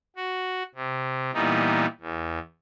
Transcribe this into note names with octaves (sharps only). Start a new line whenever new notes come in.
F#4
C3
A#2 E3 G3 B3 D#4
E2